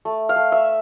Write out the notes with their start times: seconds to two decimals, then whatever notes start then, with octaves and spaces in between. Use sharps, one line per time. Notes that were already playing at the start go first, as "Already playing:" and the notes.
0.05 A3
0.29 F5
0.36 A3
0.52 E5